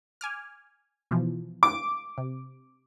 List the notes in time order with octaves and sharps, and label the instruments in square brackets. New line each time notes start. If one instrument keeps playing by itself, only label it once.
[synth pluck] G#5 D6 F6
B2 E3 F3
[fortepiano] D6
[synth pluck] C3